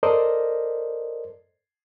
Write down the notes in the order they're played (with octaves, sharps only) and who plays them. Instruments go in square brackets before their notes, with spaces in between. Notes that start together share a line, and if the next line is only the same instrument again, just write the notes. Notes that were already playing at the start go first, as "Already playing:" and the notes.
[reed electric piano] A4 A#4 C5 D5 D#5